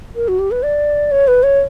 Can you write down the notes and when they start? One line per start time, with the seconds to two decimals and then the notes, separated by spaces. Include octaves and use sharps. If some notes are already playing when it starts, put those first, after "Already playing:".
0.15 A#4
0.28 F#4
0.39 G4
0.51 B4
0.63 D5
1.11 C#5
1.28 B4
1.43 C#5